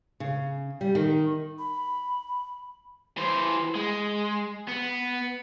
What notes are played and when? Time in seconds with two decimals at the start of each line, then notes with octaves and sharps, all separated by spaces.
0.20 C#3
0.81 G3
0.95 D#3
1.59 B5
3.17 E3 C5
3.75 G#3
4.69 B3